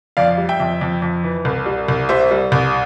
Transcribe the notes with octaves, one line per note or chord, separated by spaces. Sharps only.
F2 D5 F5
G3
E5 G5
F2
F2
F2
E3
C2
G3
C2
G3 C5 E5
G3
C2